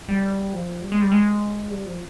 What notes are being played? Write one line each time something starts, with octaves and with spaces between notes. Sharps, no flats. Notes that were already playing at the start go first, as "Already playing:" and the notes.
G3
F3
G3
G#3
G3
G#3
G3
F3